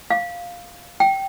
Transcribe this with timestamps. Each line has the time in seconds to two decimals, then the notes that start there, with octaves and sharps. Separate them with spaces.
0.10 F5
1.00 G5